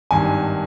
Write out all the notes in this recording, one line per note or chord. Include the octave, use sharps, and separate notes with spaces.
G#1 G2 D#3 G#5